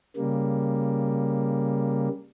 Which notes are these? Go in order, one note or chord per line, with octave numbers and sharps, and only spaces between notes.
C#3 G3 A#3